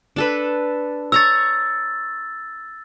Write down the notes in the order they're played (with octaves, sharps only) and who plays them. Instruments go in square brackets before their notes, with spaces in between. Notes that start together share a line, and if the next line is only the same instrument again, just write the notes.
[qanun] D4 A4 B4
[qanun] C#5 A#5 C#6 [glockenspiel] E6 A6